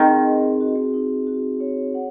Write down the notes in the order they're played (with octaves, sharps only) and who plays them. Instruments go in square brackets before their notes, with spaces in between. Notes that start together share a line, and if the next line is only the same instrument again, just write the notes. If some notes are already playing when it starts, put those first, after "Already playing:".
Already playing: [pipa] D#3 [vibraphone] C4 G#4 D#5
[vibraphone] G#4
F#4
D#4
F#4
C#5
F#5